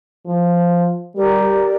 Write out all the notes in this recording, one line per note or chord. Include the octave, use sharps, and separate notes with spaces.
F3
G3 G4 A#4 D5